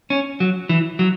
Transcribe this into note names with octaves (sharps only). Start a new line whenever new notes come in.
C#4
F#3
E3
F#3